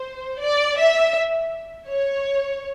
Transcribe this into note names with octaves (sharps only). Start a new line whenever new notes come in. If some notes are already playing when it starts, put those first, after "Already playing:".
Already playing: C5
D5
E5
C#5